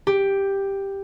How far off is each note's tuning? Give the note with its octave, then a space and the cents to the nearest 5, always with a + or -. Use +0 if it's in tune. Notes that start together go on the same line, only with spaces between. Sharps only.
G4 +5